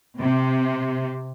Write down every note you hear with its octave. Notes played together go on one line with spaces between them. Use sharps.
C3